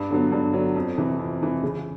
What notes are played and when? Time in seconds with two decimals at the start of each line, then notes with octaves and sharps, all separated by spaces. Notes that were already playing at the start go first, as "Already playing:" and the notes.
Already playing: G2
0.10 D3 F#3 B3
0.32 G2
0.54 D3 F#3 B3
0.75 F2
0.98 C3 E3
1.19 F2
1.41 C3 E3
1.63 C#3